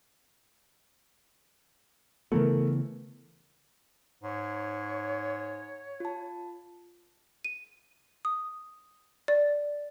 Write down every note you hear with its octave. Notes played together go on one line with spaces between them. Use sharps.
C#3 E3 A3 B3 A#4
G#2 C#5
F4 A5
D#7
D#6
D5